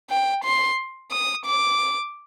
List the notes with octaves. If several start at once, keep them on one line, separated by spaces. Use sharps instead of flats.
G5
C6
D#6
D6